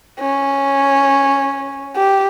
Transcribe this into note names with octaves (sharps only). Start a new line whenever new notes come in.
C#4
G4